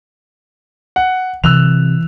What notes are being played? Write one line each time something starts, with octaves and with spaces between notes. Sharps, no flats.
F#5
C3 E3 E6 F#6 F7